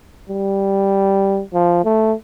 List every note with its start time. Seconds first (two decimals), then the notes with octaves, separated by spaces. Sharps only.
0.29 G3
1.54 F3
1.85 A3